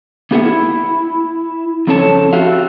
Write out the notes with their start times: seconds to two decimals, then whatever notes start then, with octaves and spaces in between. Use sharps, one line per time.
0.31 A#3 B3 G4 G#4 E5 F#5
0.45 E4
1.87 F2 C#3 C4 A4 C#5 A5
2.33 F#4 G4 E5 F5